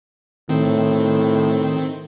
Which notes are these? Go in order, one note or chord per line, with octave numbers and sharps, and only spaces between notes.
A2 D#3 C4